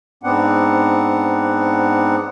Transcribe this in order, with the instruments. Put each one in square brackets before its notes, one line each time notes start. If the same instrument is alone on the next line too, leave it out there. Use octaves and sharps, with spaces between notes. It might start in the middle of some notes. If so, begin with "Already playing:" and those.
[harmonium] G#2 B3 C4 D4 F#5